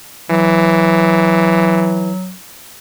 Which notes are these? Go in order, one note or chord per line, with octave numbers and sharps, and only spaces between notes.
E3 F#3